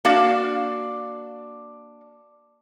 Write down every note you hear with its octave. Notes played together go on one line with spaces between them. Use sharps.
A#3 D4 F#4 D5 F5